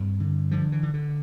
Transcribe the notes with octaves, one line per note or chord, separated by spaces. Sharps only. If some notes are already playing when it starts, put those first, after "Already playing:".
Already playing: G2 C4
D3
D3 F3
E3
D3
D3